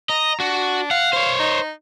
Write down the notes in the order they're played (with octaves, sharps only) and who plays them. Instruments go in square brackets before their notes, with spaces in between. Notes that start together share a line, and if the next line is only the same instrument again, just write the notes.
[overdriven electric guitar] D#5 [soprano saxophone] A#5
[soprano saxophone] D4 [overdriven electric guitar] F#4
[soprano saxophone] F5 [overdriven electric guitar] F#5
[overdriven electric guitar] C5 C#5
[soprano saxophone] D#4